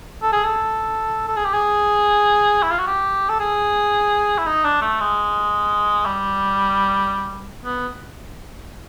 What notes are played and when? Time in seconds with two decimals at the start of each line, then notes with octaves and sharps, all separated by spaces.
0.22 A4
0.32 G#4
0.44 A4
1.28 A4
1.37 G#4
1.45 G4
1.54 G#4
2.63 E4
2.71 F4
2.79 F#4
2.87 G4
3.29 A4
3.40 G#4
4.38 E4
4.46 D#4
4.64 D4
4.81 A3
5.00 G#3
6.05 G3
7.65 B3